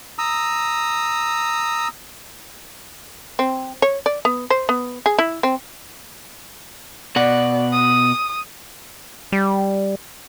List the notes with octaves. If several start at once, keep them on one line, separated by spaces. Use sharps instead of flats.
A#5 D#6 E6
C4
C#5
D5
B3
C5
B3
G#4
E4
C4
B2 D5 F#5
D#6
G3